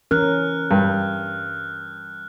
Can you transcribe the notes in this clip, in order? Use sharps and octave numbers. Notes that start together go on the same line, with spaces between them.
E3 C#4 A#4 F6 F#6
G2